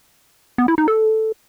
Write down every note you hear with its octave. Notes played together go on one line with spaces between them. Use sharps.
B3
E4
D#4
A4